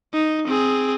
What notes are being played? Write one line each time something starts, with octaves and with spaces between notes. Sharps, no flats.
D#4
C4 G#4